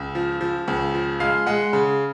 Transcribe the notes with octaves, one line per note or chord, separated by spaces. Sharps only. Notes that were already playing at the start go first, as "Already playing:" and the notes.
Already playing: C#2
F3
F3
C#2
F3
G#3 F5
G#3 F#5
C#3